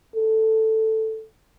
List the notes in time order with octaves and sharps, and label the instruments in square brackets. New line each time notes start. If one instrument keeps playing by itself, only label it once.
[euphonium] A4